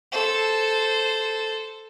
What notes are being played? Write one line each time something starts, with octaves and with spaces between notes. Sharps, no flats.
A4 C5